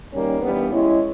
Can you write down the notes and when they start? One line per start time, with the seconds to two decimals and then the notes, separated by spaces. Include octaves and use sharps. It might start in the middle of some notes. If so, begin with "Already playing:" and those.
0.12 D#3 G3 A#3 C#4
0.40 G2 E3 G3 B3
0.70 G#3 C#4 E4